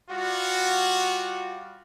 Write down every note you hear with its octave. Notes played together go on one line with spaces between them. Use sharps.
G3 F4 F#4